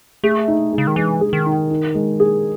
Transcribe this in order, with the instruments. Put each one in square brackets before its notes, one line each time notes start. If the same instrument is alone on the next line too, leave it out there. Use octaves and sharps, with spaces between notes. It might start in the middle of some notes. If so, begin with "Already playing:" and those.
[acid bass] A3 [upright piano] G#4
[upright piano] D#4
G#3
[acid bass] C#3
D#3
[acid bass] E3 [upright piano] G#3
[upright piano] G#4
[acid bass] D#3
[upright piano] D#4
D#4
G#3
G#4